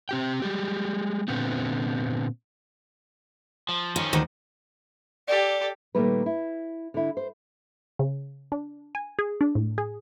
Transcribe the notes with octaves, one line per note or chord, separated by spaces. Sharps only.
C4 G4 G5
G3 G#3 G4
A#2 D3 B3 C4
F3
D#3 F3 C#4
D2 D#3
G4 A4 D5
A#2 D#3 G3 A3 A#3 B4
E4
D3 E4
C5
C#3
D4
G#5
G#4
D4
A2
G#4